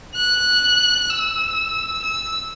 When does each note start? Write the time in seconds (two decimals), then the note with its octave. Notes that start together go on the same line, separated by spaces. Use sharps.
0.16 F#6
1.10 E6
2.03 E6